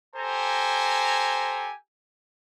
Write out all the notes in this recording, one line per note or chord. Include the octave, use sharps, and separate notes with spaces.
G4 A4 C5 G#5 A#5